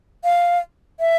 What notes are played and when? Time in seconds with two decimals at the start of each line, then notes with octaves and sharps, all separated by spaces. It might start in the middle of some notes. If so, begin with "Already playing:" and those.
0.24 F5
1.00 E5